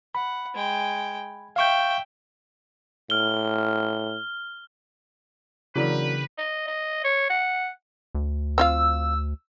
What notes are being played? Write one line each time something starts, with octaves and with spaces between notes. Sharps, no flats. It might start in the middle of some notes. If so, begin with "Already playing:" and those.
F#5 B5
G#3 G5
E5 F5 G5 C#6 G6
A2 F6 G7
C#3 E3 F#3 A#3 D4 E4 G4 B4
D#5
D#5
C#5
F#5
D2
C4 F4 F5 E6